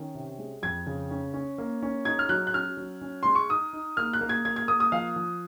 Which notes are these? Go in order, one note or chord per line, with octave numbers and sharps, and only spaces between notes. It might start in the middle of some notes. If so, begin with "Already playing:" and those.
Already playing: D#3 C#4
C3
G#3
F2 G#6
C#3
C#4
C#4
A#3
C#4
D#4 G#6
F6
F#3 F#6
F#6
C#4 F6
F#3
C#4
G#3 C6
C#6
D#4 D#6
D#4
A#3 F6
F#6
A#3
G#6
A#3 G#6
G#6
A#3 D#6
D#6
F3 F5
F3